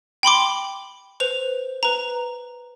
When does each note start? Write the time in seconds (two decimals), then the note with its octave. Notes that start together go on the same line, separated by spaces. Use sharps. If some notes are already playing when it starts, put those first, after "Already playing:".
0.23 G5 B5 C6 D6
1.20 B4 C5 F7
1.83 B4 A#5